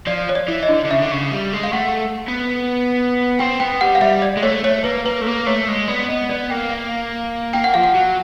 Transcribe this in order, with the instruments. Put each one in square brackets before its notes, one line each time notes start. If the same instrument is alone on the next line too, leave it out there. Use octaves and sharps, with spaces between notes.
[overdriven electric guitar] F3 [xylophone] D5
[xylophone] C#5
D5
[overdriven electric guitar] E3
[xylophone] D#5
[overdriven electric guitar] D3
D3
[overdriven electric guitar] C#3 [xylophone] E5
[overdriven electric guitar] D3
C#3
G3
G#3
[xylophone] F5
[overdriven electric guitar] A3 [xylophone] F#5
[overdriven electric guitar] B3
[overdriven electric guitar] C4 [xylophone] G5
[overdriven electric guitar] B3 [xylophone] G5
[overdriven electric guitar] G3 [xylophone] F#5
[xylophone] F5
[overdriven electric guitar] G3 [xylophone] E5
[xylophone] D5
[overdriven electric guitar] G#3
[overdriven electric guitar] A3 [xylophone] C#5
[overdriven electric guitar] A3 [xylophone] C#5
[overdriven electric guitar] A#3 [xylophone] B4
[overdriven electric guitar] A#3 [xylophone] B4
[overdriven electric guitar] A3
A#3
[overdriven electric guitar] A3 [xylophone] C#5
[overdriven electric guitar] G#3
[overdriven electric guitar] B3 [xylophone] D5
[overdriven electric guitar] B3 [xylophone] D#5
[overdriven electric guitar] B3 [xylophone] D5
[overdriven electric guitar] A#3 [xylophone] G5
[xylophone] F5
[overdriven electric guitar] A#3 [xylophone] G5
[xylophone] F#5
[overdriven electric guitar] F3 [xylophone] F5
[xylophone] F#5
[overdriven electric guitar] F#3